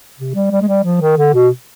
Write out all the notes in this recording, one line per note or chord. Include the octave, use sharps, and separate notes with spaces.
C3
G3
G3
G#3
G3
F3
D#3
D3
B2